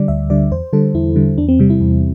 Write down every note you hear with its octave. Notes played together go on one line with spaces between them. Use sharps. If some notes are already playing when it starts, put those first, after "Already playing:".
Already playing: D3 G3 D5
D2 E5
D3 G3 D5
E2 C5
D3 G3 A4
E2 E4
D3 G3
E2 D4
C4
C3 G3
E4
E2